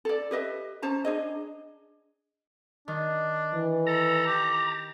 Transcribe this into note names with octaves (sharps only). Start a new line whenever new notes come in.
A4 D5
G4 B4 D#5 E5
C#4 C5 A5 A#5
D4 G#4 D#5
D#3 D4
E3
A4 A#5
G4